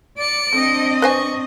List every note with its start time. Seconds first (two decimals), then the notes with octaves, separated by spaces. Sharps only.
0.18 D5 C#7 D7
0.53 A3 C4 D4 D#5
1.02 B4 C5 G#5 C#6